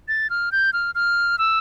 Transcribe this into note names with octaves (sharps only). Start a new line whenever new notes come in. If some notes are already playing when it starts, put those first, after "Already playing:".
A6
F6
G6
F6
F6
E6